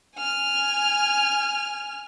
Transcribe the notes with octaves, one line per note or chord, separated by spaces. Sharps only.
G#5 F6